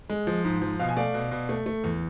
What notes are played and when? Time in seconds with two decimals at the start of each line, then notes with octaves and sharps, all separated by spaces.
0.10 G#3
0.27 F3
0.45 G#2
0.62 F3
0.80 B2 F5
0.89 G#5
0.97 A3 D5 F5
1.14 B2
1.31 B2
1.49 A3
1.66 A3
1.84 E2